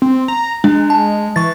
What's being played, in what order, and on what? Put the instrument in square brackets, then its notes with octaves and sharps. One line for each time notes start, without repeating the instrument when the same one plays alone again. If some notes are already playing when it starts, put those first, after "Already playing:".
[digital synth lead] C4
A#5
[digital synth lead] G#3 [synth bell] D4
[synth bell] A5
[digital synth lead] E3 [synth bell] C#6 A6